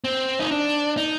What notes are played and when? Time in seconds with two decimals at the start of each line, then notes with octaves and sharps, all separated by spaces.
0.04 C4
0.40 D#4
0.51 D4
0.97 D#4